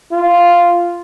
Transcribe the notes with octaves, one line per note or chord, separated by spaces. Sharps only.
F4